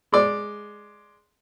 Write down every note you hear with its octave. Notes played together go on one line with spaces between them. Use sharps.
G#3 D5